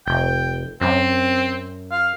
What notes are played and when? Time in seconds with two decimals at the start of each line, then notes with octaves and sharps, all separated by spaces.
0.07 F1 G5
0.81 F#2 C4
1.91 F5